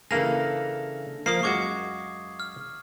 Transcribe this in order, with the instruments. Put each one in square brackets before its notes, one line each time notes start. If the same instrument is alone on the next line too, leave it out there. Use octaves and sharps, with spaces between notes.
[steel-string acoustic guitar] C#3 D4 A4 [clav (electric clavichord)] E3 A#3 G#4 [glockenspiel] A#6 F7
[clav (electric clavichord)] F3 A#3 [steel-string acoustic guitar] F5 [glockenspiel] D#6 C7
[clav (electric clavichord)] F#2 G#3 F#4 [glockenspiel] C#6 D6 G#6
[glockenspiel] F6